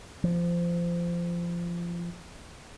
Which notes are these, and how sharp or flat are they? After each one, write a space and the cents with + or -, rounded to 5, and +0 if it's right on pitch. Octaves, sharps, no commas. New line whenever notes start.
F3 -20